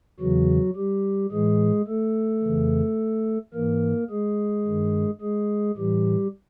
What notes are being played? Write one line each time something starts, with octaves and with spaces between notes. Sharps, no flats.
E2 C#3 E3 F#3 F#4
G3 G4
A2 E3 G#3 G#4
A3 A4
F2 C#3 E3
G#2 E3 A#3 A#4
G#3 G#4
G2 D#3
G#3 G#4
A2 E3 G3 G4